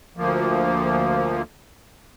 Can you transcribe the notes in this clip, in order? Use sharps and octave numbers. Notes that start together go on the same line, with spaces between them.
D2 F3 A#3